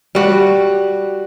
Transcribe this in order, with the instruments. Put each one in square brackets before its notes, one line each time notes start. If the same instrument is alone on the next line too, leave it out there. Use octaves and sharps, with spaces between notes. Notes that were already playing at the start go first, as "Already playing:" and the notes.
[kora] G3 F#4